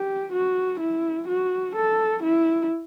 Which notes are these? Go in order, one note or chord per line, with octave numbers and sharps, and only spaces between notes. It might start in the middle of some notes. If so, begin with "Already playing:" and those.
Already playing: G4
F#4
E4
F#4
A4
E4